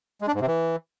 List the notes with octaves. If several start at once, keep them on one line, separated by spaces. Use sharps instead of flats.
G#3
D4
G#2
C3
E3